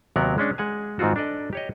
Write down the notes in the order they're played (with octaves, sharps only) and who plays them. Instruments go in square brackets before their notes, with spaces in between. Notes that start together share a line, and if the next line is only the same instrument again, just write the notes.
[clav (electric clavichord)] D#2 C3 F#3 B3 A#4 F#5
G#3 C#4 D4
G#3 F#5 G#5
G#2 D#3 C4 F4 F#4
D4 A4 D5 D#5
G4 C#5 D#5